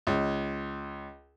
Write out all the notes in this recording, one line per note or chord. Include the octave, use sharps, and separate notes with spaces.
C#2